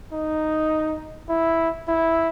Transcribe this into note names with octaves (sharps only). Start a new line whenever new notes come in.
D#4
E4
E4